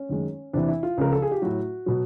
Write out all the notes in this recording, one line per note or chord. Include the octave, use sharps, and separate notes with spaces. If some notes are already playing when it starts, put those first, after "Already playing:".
Already playing: C#4
F#2 D#3 G#3
E2 C3 E3 D4
E4
F4
C#2 C#3 F3 A#4
A4
G#4
G4
A2 F#3 F#4
B2 F#3